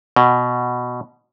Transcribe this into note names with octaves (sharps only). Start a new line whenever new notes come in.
B2